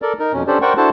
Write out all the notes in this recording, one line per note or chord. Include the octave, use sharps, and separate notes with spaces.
A4 A#4 D5
D#4 A#4
F2 B2 C#4
C#4 D4 G4 A4 C5 D5
A#4 C5 D5 F#5 G5 C#6
D4 E4 F#4 A4 C5 A5